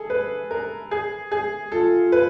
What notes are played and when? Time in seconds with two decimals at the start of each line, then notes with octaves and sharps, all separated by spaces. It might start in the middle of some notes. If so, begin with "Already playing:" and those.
Already playing: G#4 A4
0.10 B4
0.51 A#4
0.91 G#4
1.32 G#4
1.72 F4 A4
2.12 B4